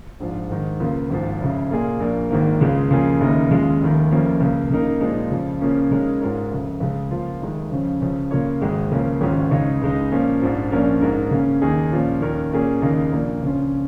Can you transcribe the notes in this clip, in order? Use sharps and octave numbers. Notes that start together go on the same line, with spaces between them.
A#1 G#2 F3
G#2 D#3 G#3
C#2 C#3 A#3 F4
G#1 G#2 F3
F1 F2 C#3
A#2 A#3 F4 G#4
A#1 A#2 A#3
G#1 G#2 D#3 A#3
C#2 C#3 G#3 F4
F2 C#3 A#3 F4 G#4
F1 D#2 C#3 A#3 D#4
D#2 C#3 G#3 F4
F1 D#2 D#3
F1 F2 F3 A#3 C#4
C#2 C#3 A#3
C#3 A#3 D#4 A#4
A#2 F3 G#3 D#4
F2 C#3 F3
C#3 F3 A#3 C#4
C#3 G#3 D#4 A#4 C#5
G#2 G#3 F4 A#4 C#5
F1 F2 C#3
C#2 C#3 G#3
C#3 F3 A#3 F4
F1 F2 D#3 G#3
F2 C#3 F3 C#4
C#2 C#3 F3 C#4
C#3 A#3 F4 C#5
G#1 G#2 D#3 G#3 D#4
C#2 C#3 F3 A#3 C#4
G#1 G#2 D#3 C#4 F4
C#2 C#3 G#3 D#4 C#5
C#2 C#3 G#3 D#4
A#2 F3 A#3 C#4
A#1 G#2 F3
A#1 A#2 F3 C#4 A#4
G#2 G#3 D#4 A#4
C#3 A#3 C#4
D#2 D#3 A#3 D#4 G#4
A#2 F3 C#4
D#2 D#3 C#4 A#4 C#5
A#2 A#3 C#4 G#4
D#2 C#3 A#3 D#4
A#1 A#2 A#3
C#2 C#3 F3 C#4 F4